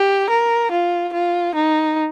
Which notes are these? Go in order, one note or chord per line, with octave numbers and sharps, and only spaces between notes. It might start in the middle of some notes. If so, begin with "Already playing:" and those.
Already playing: G4
A#4
F4
F4
D#4